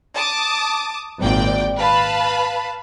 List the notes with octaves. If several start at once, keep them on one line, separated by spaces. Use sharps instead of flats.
A5 D6 D#6
G#1 A#2 D5 G5
B4 F5 A5 B5